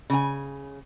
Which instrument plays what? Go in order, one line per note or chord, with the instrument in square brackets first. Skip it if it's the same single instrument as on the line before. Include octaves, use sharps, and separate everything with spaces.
[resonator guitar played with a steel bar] C#3 G#5